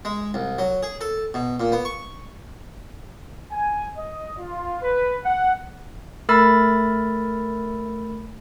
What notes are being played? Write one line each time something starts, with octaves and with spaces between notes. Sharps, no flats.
G#3
C2
F#3
G#4
A4
B2
A#2
B3
C#6
G#5
D#5
F4
B4
F#5
A3 A#4 B5 E6 A6